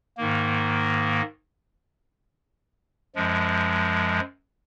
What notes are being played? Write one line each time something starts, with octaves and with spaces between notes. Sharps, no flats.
G#2 D#3 A#3
F#2 F3 G#3